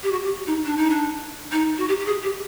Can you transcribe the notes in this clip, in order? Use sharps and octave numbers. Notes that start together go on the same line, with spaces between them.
G4
F#4
G4
D#4
D4
D#4
D4
D#4
F#4
G4
G4
G#4
G4